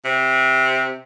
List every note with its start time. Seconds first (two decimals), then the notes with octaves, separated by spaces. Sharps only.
0.05 C3